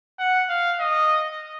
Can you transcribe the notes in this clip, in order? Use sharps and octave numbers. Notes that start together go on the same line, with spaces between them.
F#5
F5
D#5